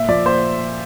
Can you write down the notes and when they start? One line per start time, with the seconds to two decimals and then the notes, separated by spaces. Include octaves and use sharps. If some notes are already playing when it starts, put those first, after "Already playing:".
Already playing: A#2 E5
0.08 F3 D5
0.26 A#2 C5